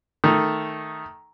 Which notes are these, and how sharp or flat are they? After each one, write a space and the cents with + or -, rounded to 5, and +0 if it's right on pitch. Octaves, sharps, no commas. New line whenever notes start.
D#3 +0 A3 -5